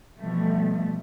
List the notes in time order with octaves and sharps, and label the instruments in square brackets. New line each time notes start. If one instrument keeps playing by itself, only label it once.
[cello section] B2 E3 F3 G3 A3